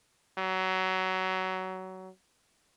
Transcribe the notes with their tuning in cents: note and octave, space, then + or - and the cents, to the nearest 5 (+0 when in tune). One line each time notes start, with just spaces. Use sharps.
F#3 +20